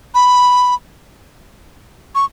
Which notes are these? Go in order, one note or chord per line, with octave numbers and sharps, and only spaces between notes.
B5
C#6